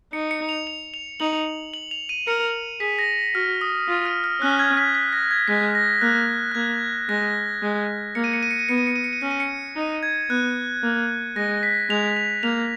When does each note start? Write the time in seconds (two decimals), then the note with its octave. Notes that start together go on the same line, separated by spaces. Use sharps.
0.13 D#4 C#7
0.31 C#7
0.49 F7
0.67 F7
0.94 F7
1.20 D#4 F#7
1.74 F#7
1.91 F7
2.09 D#7
2.27 A#4 C#7
2.80 G#4 B6
2.99 A#6
3.34 F#4 F6
3.61 D#6
3.88 F4
4.06 F6
4.24 F6
4.41 C#4 F#6
4.59 G#6
4.77 B6
4.95 B6
5.13 A#6
5.31 G#6
5.48 G#3 B6
5.75 A#6
6.01 A#3 F#6
6.52 F#6
6.55 A#3 G#6
7.09 G#3 A#6
7.62 G#3
8.15 A#3 C#7
8.24 D#7
8.33 C#7
8.43 D#7
8.51 C#7
8.59 D#7
8.69 B3 C#7
8.78 D#7
8.87 C#7
8.96 D#7
9.04 C#7
9.13 D#7
9.21 C#4 C#7
9.31 D#7
9.40 C#7
9.76 D#4
10.03 G#6
10.30 B3 F#6
10.83 A#3
11.36 G#3 A#6
11.63 B6
11.90 G#3 F7
12.17 F7
12.43 A#3 F7